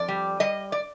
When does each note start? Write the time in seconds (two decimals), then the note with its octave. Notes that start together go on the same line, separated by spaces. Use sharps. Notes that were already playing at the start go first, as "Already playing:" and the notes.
Already playing: F2 D5
0.08 G3
0.40 G3 D#5
0.72 D5